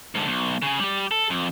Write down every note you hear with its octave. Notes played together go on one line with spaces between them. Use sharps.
G#2 D3
B1
C#3 G#4
G3 G4
A4
F2